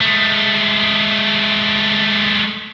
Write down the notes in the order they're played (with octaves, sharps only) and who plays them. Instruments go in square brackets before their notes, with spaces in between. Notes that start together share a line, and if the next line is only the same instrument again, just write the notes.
[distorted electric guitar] G#3 A3